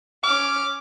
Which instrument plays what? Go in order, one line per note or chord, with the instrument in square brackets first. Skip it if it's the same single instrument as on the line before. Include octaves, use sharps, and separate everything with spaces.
[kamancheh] C#4 F6 [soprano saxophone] D6